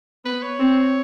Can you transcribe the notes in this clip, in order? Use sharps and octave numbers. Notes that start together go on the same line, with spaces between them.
B3 B4
C#5
C4